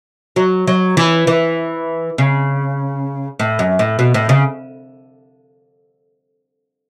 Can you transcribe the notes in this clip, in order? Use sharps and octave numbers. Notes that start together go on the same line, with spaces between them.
F#3
F#3
E3
E3
C#3
A2
F#2
A2
B2
A2
C#3